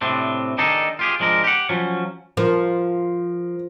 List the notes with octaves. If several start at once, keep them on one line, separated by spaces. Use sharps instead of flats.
A2 C3 C4 D4
D#3 D4 D#4 G#4 A4
F4 G4 G#4
F3 G#3 D4 A#4
G4 F#5
F3 F#3 C#4
F3 A#4